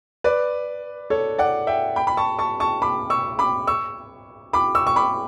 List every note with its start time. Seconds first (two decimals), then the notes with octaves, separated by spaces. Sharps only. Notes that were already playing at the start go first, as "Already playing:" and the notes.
0.24 B4 D5
1.10 A4 C#5
1.38 D5 F#5
1.67 E5 G5
1.96 G5 B5
2.07 B5
2.17 A5 C#6
2.39 A5 C#6
2.60 A5 C#6
2.82 B5 D6
3.10 C#6 E6
3.39 B5 D6
3.67 C#6 E6
4.53 B5 D6
4.75 C#6 E6
4.87 C#6
4.96 B5 D6